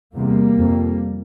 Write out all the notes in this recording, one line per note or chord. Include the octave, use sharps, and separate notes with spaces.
E2 C3 G3 A#3
F2 C3